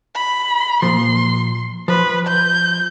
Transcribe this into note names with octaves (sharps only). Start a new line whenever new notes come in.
B5
A#2 F3 C6
F3 B4 C5
G6